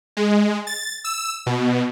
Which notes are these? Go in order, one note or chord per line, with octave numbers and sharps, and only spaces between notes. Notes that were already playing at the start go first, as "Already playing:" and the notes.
G#3
A6
E6
B2